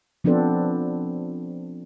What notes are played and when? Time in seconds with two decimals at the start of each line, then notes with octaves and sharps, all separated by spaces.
0.24 F3 B3 C4 D4 A4 C5